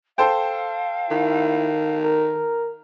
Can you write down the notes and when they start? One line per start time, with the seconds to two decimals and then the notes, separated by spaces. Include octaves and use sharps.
0.18 A4 C5 F5 G5
1.10 D#3 E4
2.04 A#4